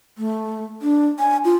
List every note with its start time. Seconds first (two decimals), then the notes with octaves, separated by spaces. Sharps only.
0.18 A3
0.82 D4
1.19 G#5
1.45 F4